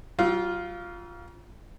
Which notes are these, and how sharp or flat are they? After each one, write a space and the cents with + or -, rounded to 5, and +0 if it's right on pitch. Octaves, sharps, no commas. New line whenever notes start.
F#3 +45 F4 +0